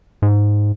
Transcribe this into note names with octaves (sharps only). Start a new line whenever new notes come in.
G#2